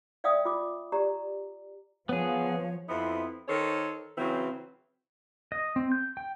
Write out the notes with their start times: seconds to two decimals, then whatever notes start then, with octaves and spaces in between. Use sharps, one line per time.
0.24 D5 E5 F5 G5 D#6 E6
0.45 F4 D6
0.92 G4 D5 A#5
2.09 F3 B3 G#4 C#5
2.88 F2 B3 C4 E4
3.48 D#3 A4 C5 C#5
4.18 C#3 E3 F#3 C4
5.52 D#5
5.76 C4
5.92 G6
6.17 G5